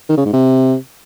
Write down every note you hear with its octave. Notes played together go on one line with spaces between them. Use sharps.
D#3
C#3
G#2
C3